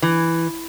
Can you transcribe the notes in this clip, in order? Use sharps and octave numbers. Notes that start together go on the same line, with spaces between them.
E3